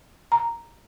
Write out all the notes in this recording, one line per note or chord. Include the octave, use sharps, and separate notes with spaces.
A#5